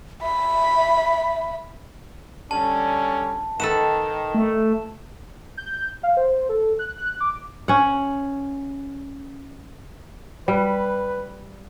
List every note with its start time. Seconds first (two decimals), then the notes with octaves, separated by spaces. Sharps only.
0.22 E5 B5
2.51 D3 G3 C#4 A5
3.60 D#3 A4 B4 F#5 E7
4.35 A3
5.57 G6
6.03 F5
6.17 C5
6.49 A4
6.79 F#6
6.98 F#6
7.20 D6
7.68 C#4 F#5
10.48 G3 B4